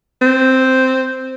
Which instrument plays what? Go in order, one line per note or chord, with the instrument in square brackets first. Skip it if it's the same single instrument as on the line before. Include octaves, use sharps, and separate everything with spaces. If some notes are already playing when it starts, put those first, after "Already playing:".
[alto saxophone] C4